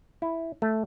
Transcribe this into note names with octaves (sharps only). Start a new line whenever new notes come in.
E4
A3